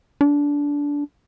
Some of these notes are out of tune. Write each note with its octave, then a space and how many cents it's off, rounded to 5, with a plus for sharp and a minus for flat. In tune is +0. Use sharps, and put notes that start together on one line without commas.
D4 -20